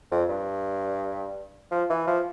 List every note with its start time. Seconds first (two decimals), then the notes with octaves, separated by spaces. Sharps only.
0.12 F2
0.29 G2
1.71 F3
1.90 E3
2.07 F3